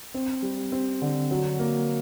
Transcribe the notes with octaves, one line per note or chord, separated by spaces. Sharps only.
C4
G3
C4
D3
F#3
A#3